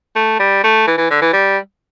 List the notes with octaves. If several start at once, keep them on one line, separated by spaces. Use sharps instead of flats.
A3
G3
A3
E3
E3
D3
E3
G3